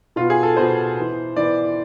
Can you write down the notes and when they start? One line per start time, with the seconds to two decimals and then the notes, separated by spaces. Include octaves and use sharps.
0.16 B2 B3 F4
0.30 G#4
0.43 A4
0.57 B2 B3 C5
0.97 E3 B3
1.36 E3 B3 D5